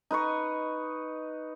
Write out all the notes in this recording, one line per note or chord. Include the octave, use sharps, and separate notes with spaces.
D#4 B4 D#5 C#6